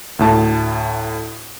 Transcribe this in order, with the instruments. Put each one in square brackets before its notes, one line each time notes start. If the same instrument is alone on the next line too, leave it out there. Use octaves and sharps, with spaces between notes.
[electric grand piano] D2 A2 A5